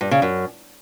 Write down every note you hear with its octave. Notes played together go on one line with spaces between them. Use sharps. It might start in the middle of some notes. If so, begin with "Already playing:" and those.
G2
C#3
F#2